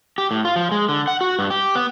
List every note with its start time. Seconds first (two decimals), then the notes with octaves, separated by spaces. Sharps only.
0.18 G4
0.31 A2
0.45 F4
0.56 F3
0.72 G#3
0.89 D3
1.07 F#5
1.21 F#4
1.39 G2
1.50 G4
1.75 B3